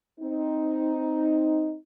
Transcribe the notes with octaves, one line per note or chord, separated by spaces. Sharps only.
C4 D#4